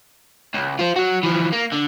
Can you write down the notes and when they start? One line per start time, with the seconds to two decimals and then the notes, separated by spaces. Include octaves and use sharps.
0.54 C#2
0.79 F4 C5
0.96 F#3 F#4
1.23 E3 F3
1.52 A#3
1.72 D3